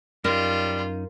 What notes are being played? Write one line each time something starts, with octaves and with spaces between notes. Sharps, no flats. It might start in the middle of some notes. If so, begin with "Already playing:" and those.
F#2 G3 C#4 D#4 F4 A#4